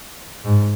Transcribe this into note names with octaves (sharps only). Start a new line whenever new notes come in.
G#2